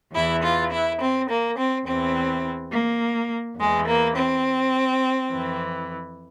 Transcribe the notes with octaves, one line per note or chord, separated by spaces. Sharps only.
E2 E3 E4
F4
E4
C4
A#3
C4
E2 E3 C4
A#3
E2 E3 G#3
A#3
C4
F2 E3